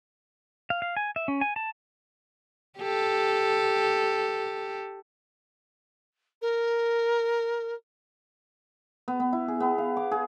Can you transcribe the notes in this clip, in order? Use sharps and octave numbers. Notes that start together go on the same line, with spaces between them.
F5
F5
G#5
E5
C#4
G#5
A5
G4 A4
A#4
B3
B3
E4
G#4
B3
F5
D6
G#4